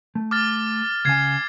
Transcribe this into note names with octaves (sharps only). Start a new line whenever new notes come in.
A3
D6 F6 A6
C#2 C#3 G#5 G#6 C7